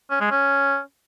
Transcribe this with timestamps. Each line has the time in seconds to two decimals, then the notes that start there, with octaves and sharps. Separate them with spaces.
0.11 C#4
0.21 G#3
0.31 C#4